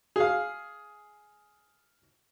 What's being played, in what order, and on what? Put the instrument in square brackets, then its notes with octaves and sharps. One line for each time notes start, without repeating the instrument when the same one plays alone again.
[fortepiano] G#4 F5